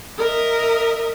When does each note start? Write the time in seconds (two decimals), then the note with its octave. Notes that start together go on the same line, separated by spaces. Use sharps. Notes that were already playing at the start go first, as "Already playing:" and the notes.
0.18 A#4 D#5 E5